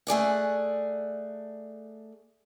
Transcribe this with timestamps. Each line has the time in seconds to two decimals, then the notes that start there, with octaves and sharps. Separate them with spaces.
0.07 A3 G#4 D5 F#5